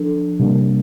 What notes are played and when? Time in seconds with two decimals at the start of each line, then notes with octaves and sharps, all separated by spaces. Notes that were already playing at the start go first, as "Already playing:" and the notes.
Already playing: F3 D4 A4
0.39 C3 G3 A#3 D4